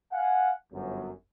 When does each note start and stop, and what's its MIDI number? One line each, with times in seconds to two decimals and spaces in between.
0.12 0.51 77
0.12 0.51 78
0.12 0.51 80
0.72 1.11 31
0.72 1.11 42